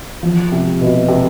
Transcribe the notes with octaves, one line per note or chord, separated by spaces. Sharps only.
F3
C3
B2
C3